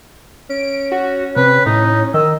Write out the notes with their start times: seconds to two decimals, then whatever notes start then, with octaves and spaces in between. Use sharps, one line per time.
0.50 C#4 D7
0.92 F#4
1.36 C3 B4
1.66 A2 D#4
2.14 D#3 D#5 E6